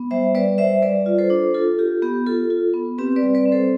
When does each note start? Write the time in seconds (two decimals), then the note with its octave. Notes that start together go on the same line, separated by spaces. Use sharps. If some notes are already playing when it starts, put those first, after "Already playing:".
Already playing: B3
0.11 G3 C5 E5
0.35 G3 B4 D5
0.58 G3 C5 E5
0.82 G3 B4 D5
1.06 F4
1.18 A4 C5
1.30 D4
1.54 F4 A4
1.78 F4 G4
2.02 B3 G4
2.26 F4 A4
2.50 F4
2.74 B3
2.98 C4 G4 B4
3.16 B4 D5
3.22 G3
3.35 B4 D5
3.46 C4
3.52 A4 C5